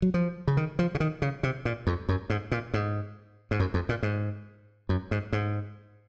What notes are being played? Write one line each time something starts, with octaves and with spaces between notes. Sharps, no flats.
F#3
F3
C#3
D#3
F3
C#3
D#3
C#3
C3
A#2
F2
F#2
G#2
A#2
G#2
G#2
F#2
F2
A#2
G#2
F#2
G#2
G#2